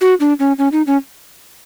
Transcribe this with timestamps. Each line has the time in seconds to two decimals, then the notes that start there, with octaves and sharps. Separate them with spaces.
0.01 F#4
0.20 D4
0.39 C#4
0.58 C#4
0.72 D#4
0.87 C#4